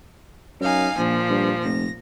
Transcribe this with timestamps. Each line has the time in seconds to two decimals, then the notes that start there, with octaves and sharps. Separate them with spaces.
0.61 F#2 D#4 F5 G#5
0.98 A#1 A#2 F3
1.30 G2
1.64 F1 A#6